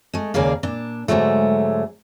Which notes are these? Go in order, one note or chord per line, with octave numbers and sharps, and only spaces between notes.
G#3 A3
D#2 C#3 A#3 G#4 D5 F5
A#2 D4
G#2 D3 F#3 G#3 A3